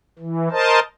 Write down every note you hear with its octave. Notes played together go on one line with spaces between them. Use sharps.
E3
A#4 C5 D#5 A5